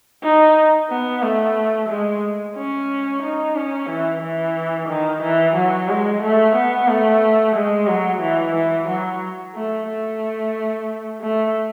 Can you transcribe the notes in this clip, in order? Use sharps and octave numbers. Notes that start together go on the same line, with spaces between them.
D#4
B3
A3
G#3
C#4
D#4
C#4
E3
E3
D#3
E3
F#3
G#3
A3
B3
A3
G#3
F#3
E3
E3
F#3
A3
A3
A3